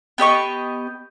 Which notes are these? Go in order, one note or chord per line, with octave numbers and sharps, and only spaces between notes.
B3 G4 D#5 C#6